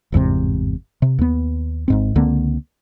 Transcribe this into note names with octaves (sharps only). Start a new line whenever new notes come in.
G1 E2 G#2 C3
C3
D#2 B3
G#1 G#2 C4
C#2 D3 A#3 C4